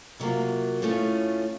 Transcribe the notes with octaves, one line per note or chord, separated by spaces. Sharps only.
C3 F#3 A#3 F4
A2 A3 C#4 F4